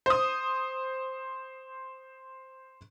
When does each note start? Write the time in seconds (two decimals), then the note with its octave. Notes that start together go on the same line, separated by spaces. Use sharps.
0.06 C5 D#6